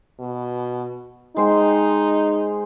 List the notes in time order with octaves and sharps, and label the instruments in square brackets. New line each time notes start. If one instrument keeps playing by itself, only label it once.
[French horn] B2
[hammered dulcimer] G#3 C5 G5 [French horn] D#4